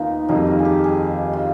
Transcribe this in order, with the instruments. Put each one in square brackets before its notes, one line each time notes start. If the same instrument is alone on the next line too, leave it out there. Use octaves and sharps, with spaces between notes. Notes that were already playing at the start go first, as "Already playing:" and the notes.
Already playing: [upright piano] D#2 D#3 B3 [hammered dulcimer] D#4 F4
[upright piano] F2 D#3 G3 [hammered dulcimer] D#4
[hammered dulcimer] F4
G#4
G4
G#4
F4